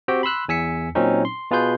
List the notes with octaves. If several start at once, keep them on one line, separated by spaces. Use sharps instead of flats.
C4 F#4 G4 G5
B5 C6 E6 F#6
E2 G#5 E6 B6 C#7
A#2 F#3 C4 C#4 D#4
C6
B2 F4 G#4 B4 C6 G6